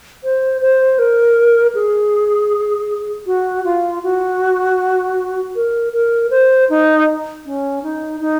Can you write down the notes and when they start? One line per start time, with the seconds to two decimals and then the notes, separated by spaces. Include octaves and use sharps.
0.24 C5
0.62 C5
0.99 A#4
1.75 G#4
3.26 F#4
3.64 F4
4.04 F#4
5.55 A#4
5.93 A#4
6.31 C5
6.70 D#4
7.46 C#4
7.83 D#4
8.20 D#4